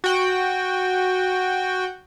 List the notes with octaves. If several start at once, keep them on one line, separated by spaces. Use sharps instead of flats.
F#4 G5